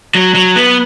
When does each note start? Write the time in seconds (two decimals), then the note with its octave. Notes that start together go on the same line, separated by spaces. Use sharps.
0.15 F#3
0.35 F#3
0.56 B3